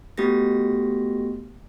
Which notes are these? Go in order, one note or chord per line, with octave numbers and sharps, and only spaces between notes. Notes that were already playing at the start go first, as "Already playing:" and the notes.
A3 B3 F#4 G4 A#6